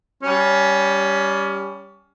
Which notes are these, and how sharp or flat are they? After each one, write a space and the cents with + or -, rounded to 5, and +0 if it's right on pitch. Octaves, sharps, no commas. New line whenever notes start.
G3 +0 C#4 +20